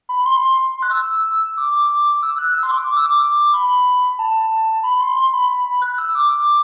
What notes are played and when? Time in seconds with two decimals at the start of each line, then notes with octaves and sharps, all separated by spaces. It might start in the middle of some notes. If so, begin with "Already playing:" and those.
0.09 B5
0.20 B5
0.26 C6
0.83 F#6
0.91 E6
1.57 D6
2.22 E6
2.38 F#6
2.55 E6
2.63 C6
2.71 D6
2.87 D6
2.97 E6
3.06 D6
3.53 B5
4.19 A5
4.83 B5
5.00 C6
5.16 C6
5.33 B5
5.82 F#6
5.98 E6
6.09 E6
6.15 D6